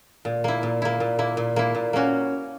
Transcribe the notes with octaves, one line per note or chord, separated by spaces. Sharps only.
A#2
A#3 E4
A#2
A#3 E4
A#2
A#3 E4
A#2
A#3 E4
A#2
A#3 C#4 F#4